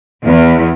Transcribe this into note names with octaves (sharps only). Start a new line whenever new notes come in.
E2